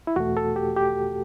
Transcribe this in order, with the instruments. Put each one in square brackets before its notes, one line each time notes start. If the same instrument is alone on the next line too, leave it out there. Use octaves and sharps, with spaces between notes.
[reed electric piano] E4
E2 B2 A3 F#4
A4
G4
G4